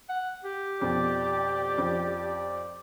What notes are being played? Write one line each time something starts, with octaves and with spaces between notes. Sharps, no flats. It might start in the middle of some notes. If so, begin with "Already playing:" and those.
F#5
G4
F2 B2 D5
F2